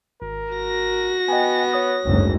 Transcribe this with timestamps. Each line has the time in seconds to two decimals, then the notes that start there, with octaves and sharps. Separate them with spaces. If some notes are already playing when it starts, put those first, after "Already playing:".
0.22 G#1 A#4
0.54 F#4 A#6
1.28 B3 D#5 G5 G#5
1.72 C#5 D#6 F#6
2.05 F#1 D2 G#2